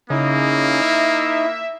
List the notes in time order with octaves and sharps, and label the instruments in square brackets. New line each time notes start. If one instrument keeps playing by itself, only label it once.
[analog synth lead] C#3 [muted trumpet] A#3 [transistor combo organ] D#4 [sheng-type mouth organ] E4
[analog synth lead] E5